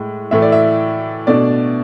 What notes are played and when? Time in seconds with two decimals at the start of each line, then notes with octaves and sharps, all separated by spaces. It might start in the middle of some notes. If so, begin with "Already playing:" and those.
Already playing: A2 G#3
0.31 A2 E3 A3 E5
0.42 D5
0.52 E5
1.27 B2 A3 D4 D5